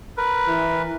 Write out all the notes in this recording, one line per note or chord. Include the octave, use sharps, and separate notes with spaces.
A#4 B4
E3